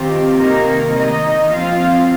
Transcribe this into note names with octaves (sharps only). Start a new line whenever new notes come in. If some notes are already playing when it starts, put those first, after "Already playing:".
Already playing: D#3 C4 F4 G4
C3 D#3 A#3 D#4 A#4
D#3 A#3 D#4 D#5
F3 C4 F4 F5